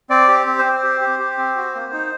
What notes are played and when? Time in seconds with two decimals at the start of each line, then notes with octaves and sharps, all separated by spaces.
0.10 C4 D5
0.28 G4
0.47 C4
0.59 C5
0.64 C4
0.83 G4
1.01 G4
1.20 G4
1.38 C4
1.56 F#4
1.74 A#3
1.93 D#4